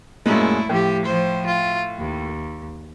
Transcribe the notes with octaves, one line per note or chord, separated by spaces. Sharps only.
F#2 A#2 G#3 A3 E4
A2 F3 G4
F3 C5
F4
D#2